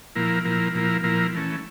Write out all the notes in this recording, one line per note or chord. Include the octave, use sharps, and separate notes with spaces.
A#2 F3 A#3 E4 A#4
A#2 F3 A#3 E4 A#4
A#2 F3 A#3 E4 A#4
A#2 F3 A#3 E4 A#4
E3 A3 C#4